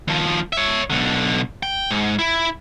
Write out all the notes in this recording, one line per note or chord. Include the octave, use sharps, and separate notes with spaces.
D#2 F3
C#5 E5
B1 D3
G5
G#2
E4